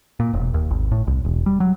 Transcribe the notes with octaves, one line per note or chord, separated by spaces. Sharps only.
A#2
E1
D#2
G#1
A2
C2
E1
G3
F#3